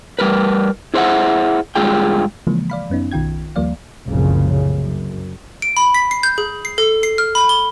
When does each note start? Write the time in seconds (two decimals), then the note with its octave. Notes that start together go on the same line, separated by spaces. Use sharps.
0.19 G3 A#4 B4
0.94 E4 G#4 C5 D#5 E5 F#5
1.75 G2 G#3 F4 G#4 G5
2.47 C#3 E3 F3 G#3 A#3
2.70 D5 F5 B5
2.90 F#2 B3 C#4 D#4
3.12 B1 D#3 F4 G5 G#6
3.56 D#2 F3 G3 A#3 D5 F5
4.06 F#1 C2 A#2 C#3 F3
4.76 F#2
5.62 D7
5.77 B5
5.94 B6
6.11 C7
6.23 G6
6.38 G#4
6.65 C7
6.78 A4
7.03 C7
7.18 F6
7.35 B5
7.49 G7